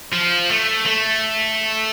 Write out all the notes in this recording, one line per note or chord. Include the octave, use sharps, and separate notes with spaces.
F3
A3
A3